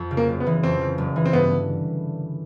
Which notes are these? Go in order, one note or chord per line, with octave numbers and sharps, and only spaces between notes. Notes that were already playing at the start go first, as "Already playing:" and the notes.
Already playing: F2
C#3
A#3
F#1
B3
E3
F2 C4
C#3
F#1
E3
C4
G2 B3
D3